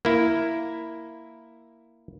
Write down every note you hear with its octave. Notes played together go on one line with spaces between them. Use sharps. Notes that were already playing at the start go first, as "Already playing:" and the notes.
A#3 E4